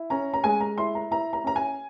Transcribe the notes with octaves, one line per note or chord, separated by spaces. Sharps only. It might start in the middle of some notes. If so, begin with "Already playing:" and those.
Already playing: E4
C#4 A#5
A#5
G#3 G#5
A#5
E4 C6
A#5
E4 A#5
A#5
C#4 A#5
G#5